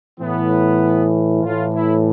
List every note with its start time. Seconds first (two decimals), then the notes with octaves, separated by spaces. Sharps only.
0.19 A2 E3 B3
1.43 A2 E3 F4
1.74 E4